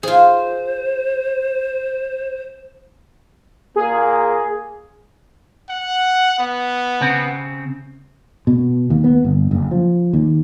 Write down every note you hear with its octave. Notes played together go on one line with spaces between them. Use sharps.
F4 G#4 C5
A#2 A#3 G#4
F#5
B3
C#3 C4
B2
D#2
B3
G1
F#1
F3
D#2